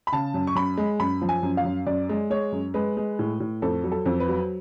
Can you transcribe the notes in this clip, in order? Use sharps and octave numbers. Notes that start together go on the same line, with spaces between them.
B5
C#3 A5
F#2
C#6
F#2 B5
G#3
F#2 B5
F3
G#5
F#2
F5
F#2
F#2 D5
G#3
G#3 C#5
F#2
G#3 B4
G#3
A2
A2
F2 A4
F#3
A4
F2
B4
F#3